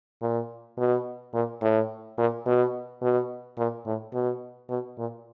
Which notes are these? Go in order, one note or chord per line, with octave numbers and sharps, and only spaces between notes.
A#2
B2
A#2
A2
A#2
B2
B2
A#2
A2
B2
B2
A#2